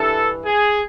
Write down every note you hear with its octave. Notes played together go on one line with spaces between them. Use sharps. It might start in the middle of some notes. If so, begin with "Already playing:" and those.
Already playing: G2 E3 A4
G#4